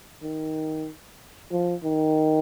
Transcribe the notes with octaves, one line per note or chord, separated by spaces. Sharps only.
D#3
F3
D#3